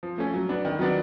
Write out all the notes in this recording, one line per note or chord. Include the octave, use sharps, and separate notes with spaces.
F3
A3 C#4
F#3
B3 D4
D#3
F#3 B3 D4